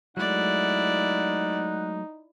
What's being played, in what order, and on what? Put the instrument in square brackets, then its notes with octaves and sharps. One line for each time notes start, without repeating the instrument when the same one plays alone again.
[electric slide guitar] F#3 G#3 A3 [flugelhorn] D#4 [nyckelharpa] E4 D5 [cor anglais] F#5